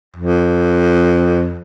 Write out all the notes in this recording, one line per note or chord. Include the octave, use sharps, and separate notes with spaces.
F2